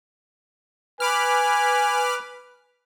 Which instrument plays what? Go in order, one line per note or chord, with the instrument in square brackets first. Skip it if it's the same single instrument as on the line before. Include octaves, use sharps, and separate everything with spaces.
[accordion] B4 [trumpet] G#5 [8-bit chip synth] B5 D6 F6